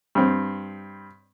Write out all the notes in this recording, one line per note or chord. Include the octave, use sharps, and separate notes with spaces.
G2 C4